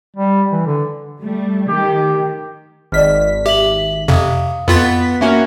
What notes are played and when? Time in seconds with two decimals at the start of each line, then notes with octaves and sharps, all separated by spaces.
0.17 G3
0.52 E3
0.66 D3
1.19 G3 A3
1.67 D#3 G4
2.92 G#1 D5 D#5 F6 B6
3.46 G4 E5 F#7
4.08 F2 C3 F5 D#6
4.68 F2 B3 F4 A6 B6
5.21 A#3 C#4 F#4 E5